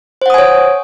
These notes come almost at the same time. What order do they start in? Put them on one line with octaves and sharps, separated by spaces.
C5 F#5 D#6 G#5 C#5